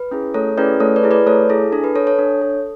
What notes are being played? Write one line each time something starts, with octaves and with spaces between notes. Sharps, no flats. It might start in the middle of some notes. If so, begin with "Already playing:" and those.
Already playing: B4
C#4 E4 G#4
A3 A4 C#5
C#4 E4 G#4 B4 D5
A3 A4 C#5
B4 D5
E4 G#4
B4 D5
A3 A4 C#5
E4 G#4 A4
D4 A4
B4
A4 C#5
A4 C#5
D4
A4